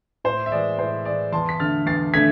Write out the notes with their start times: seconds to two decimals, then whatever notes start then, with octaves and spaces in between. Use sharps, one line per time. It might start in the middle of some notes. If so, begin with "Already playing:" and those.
0.24 A2 C5
0.46 E5
0.51 E3 G#3 D5
0.78 A2 C5
1.05 E3 G#3 D5
1.32 E2 A5 C6
1.49 B6
1.60 D3 A3 F6 A6
1.86 E2 A6 C7
2.14 D3 A3 G#6 B6